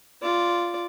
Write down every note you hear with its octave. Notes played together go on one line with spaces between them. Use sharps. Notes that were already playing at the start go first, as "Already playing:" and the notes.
F4 D5